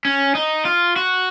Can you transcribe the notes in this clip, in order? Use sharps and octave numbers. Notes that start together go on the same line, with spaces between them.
C#4
D#4
F4
F#4